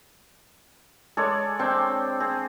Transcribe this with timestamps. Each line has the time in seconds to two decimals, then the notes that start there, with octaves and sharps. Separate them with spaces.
1.17 G#3 A4 C#5 D5
1.59 C4 D4 G5
2.20 C4 G#4